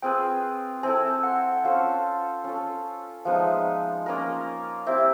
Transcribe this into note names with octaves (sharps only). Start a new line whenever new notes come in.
C4 F4 G#4 B4 G5
C4 E4 A4 G#5
F#5
F#5
C#4 F4 A4 C5 F5
C#4 F4 A4
F3 G#3 B3 D#4 F5
E5
F5
A#3 C#4 F4 A#4
C4 E4 G4 E5